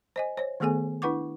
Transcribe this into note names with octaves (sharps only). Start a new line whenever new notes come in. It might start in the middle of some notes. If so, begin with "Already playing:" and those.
C5 D#5 G#5
C5 C#5
D#3 A3 B3 G#4 A4 G#5
D4 E4 B4 F#5 C#6 D6